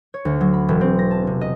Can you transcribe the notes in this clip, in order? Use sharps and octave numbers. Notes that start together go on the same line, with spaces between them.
C#5
D2
F#3
B5
E1
C4
A#6
A5
C3
D#5